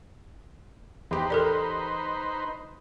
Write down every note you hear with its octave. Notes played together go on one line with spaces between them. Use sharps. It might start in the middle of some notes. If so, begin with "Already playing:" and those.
E2 D#4 G4 B4 C5
A4 A#4 D5